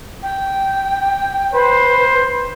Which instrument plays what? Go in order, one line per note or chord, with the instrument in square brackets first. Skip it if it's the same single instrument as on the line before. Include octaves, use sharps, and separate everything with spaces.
[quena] G5
[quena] B4 [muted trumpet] C5